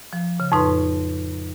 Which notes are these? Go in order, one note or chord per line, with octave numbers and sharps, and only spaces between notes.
F3
C#3
F2 A2 D#4 B4 C6